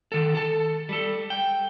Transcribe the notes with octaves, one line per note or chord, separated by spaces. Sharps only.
D#3 A4
A4 A5
G3 A4
G5